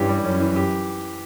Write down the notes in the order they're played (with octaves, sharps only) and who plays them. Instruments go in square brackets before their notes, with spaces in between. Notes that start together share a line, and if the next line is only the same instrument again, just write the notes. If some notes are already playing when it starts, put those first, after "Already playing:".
Already playing: [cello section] G2 [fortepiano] E3 C#4 G4
[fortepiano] G3
[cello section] F#2 [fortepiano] C#4
[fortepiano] E3
G4